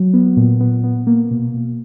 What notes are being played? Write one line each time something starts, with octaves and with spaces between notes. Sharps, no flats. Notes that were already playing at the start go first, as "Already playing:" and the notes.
Already playing: F#3
B3
A#2
B3
B3
A#3
B2
B2